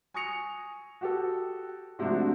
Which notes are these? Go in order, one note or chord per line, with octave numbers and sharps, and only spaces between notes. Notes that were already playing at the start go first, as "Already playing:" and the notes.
G#5 C#6 D#6 A#6 C#7 F7
F#4 G4 A4
G#2 C3 F3 A3 D4 F#4